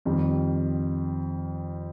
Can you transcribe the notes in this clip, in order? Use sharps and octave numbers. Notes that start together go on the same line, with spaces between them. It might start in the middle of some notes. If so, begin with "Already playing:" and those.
F2 D#3 G3